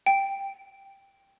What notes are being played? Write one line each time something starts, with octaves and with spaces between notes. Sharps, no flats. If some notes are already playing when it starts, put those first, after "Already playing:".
G5